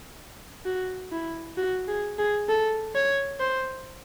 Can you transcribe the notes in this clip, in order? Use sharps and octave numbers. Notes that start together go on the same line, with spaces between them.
F#4
E4
F#4
G#4
G#4
A4
C#5
C5